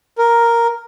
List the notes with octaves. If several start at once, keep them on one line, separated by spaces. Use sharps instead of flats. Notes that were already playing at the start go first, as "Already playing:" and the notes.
A#4